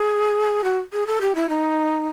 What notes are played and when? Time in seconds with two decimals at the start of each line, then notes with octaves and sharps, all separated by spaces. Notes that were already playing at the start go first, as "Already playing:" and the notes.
Already playing: G#4
0.64 F#4
0.92 G#4
1.06 A4
1.21 G4
1.35 E4
1.49 D#4